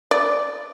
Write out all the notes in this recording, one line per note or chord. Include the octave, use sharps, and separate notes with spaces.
D5